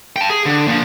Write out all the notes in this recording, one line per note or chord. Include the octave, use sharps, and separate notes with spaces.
G5 A5
G#4
D3
A#2 F3